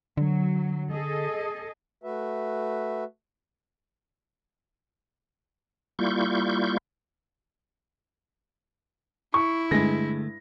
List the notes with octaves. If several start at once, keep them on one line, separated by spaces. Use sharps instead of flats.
D3 F#3
G#4 A4 D#5
A3 F#4 B4 E5
G3 A#3 E4 F4 C#6 G6
E4 C#6
G2 D3 G#3 A3 A#6